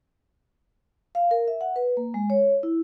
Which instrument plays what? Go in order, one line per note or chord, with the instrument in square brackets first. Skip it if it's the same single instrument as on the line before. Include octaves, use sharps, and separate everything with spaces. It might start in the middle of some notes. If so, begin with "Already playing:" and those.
[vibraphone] F5
A#4
E5
F#5
B4
A#3
G#3
C#5
E4